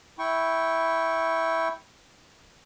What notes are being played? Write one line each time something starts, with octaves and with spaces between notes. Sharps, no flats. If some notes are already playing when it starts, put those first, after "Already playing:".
E4 G5 C#6